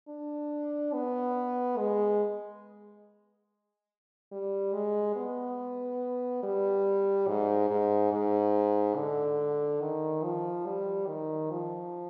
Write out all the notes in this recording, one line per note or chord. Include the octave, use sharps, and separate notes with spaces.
D4
B3
G#3
G3
G#3
B3
G3
G#2
G#2
G#2
D3
D#3
F3
G3
D#3
F3